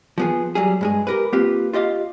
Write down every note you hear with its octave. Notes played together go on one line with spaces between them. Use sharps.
F3 B3 G#4
F#3 G3 G#4
G2 G#3 G#4
G4 A#4 B4
A#3 C4 F4 G4 B4
F4 G4 D#5 F5